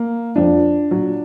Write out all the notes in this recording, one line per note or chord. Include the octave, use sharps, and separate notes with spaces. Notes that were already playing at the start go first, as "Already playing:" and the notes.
Already playing: A#3
F2 F3 D4
A#2 F#3